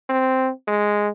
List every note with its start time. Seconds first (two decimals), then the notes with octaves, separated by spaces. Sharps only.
0.09 C4
0.68 G#3